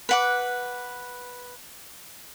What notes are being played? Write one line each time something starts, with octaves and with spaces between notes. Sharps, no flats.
B4 F#5 D6